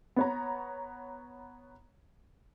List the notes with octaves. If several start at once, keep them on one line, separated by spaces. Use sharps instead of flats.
B3 C#5 A#5